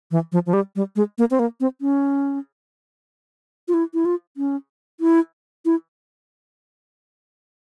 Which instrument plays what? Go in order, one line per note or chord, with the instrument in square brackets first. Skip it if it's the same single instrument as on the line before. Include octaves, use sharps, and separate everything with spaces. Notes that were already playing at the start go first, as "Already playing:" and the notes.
[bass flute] E3
F3
F3
G3
G3
G#3
A#3
C4
A#3
C4
C#4
F4
E4
E4
F4
C#4
E4
E4